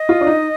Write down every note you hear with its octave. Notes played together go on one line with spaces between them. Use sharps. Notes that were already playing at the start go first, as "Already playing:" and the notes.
Already playing: D#5
F4
D4
D#4